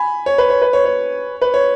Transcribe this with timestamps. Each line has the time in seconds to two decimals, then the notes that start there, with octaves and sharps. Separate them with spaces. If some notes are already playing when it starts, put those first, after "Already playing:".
Already playing: G#5 B5
0.26 C#5
0.38 B4
0.50 C#5
0.62 B4
0.73 C#5
0.85 C#5
1.41 B4
1.54 C#5